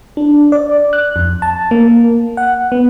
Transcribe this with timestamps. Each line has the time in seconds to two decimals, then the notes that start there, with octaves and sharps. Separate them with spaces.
0.17 D4
0.52 D5
0.93 F#6
1.16 F2
1.42 A5
1.71 A#3
2.37 F#5
2.72 B3